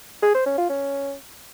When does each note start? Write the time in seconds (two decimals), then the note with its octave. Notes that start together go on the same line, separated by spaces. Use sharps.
0.23 G#4
0.35 C5
0.46 C#4
0.58 F4
0.70 C#4